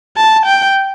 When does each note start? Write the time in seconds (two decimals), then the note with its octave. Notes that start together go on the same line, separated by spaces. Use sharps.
0.17 A5
0.46 G5